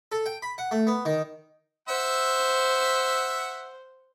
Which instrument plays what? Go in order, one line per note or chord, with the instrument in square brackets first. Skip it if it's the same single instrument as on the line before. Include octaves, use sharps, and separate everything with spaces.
[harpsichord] A4
G5
B5
F#5
A3
B3
D#3
[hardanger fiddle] C5 [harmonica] E5 F#5